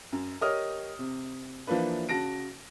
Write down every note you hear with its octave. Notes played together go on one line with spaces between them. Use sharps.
F#2
G4 A#4 C#5 D#5 D#6 F6
C3
E3 F3 A#3 D4 B4
C#3 F#4 A5 A#6 D7